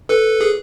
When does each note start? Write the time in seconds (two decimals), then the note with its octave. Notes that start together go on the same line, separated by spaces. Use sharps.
0.09 A4 B4
0.41 G#4